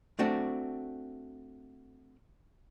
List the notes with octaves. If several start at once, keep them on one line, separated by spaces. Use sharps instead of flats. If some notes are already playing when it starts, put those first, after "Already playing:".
A3 C4 D4 F#4